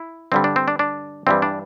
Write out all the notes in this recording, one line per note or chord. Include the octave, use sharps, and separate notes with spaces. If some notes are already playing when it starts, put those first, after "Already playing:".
Already playing: E4
G2 D3 G3 C4
D4
C4
D4
D4
G2 E3 G3 C4
D4